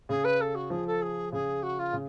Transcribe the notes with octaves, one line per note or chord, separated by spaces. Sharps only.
C#3 G#4
B4
A4
F#4
F3 G#4
A4
G#4
C#3 G#4
F#4
F4
C#3